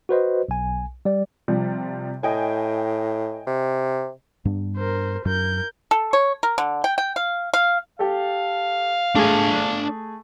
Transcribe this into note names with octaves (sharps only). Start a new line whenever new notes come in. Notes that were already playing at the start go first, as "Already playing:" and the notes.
F#4 B4 C5 D#5
B1 G#5
G3 D5
C3 F3 G3
A2 D#5 G5 G#5
C3
G2 B3 D4
A#4 C5
F#2 A#4 G6
A4
C#5
A#4
D3
G5
G5
F5
F5
G4 A4 F5
A3 D4 G#4 G#5